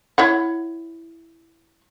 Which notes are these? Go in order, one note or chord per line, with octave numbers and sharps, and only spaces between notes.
E4 C#5 F#5